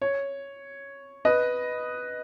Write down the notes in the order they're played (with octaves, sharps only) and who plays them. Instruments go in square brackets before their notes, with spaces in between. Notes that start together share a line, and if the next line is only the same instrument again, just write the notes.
[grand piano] C#5
B4 D#5